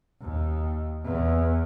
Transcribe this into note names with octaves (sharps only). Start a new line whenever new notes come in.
D#2
E2